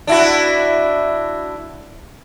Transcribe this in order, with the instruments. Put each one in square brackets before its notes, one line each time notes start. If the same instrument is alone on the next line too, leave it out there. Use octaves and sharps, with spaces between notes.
[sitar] D4 E4 F#4